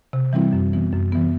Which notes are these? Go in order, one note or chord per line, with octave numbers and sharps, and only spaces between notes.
C3
E3 G3 C4 E4
F#2
E3 B3
F#2
E3 B3